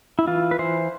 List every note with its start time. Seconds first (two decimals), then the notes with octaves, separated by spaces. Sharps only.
0.19 E4
0.27 E3 F4
0.51 B4
0.59 E3 C5